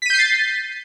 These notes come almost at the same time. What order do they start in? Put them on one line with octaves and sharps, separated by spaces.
B6 D#7 G6 C7 A6